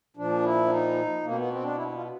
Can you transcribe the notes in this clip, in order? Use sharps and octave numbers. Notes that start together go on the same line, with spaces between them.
A#2 F3 D4
E4
D4
D#4
B2 A#3
C4
B3
C4
D4
E4
E4
F4